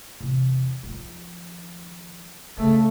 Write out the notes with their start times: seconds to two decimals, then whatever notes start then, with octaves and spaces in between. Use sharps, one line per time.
0.21 E2 C3
0.83 D#3 F3
2.57 C#3 A3 C4